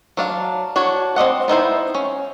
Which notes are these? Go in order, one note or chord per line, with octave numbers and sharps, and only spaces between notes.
F#3 D4 F5
D4 F#4 C#5
C4 D5 D#5 F#5
B3 D#4 E4 C5
C#4